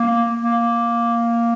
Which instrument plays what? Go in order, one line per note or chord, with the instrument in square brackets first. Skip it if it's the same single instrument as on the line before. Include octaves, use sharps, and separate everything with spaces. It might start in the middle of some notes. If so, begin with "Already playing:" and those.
Already playing: [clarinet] A#3
A#3